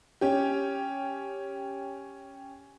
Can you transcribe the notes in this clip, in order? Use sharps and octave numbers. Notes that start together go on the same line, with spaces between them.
C#4 G4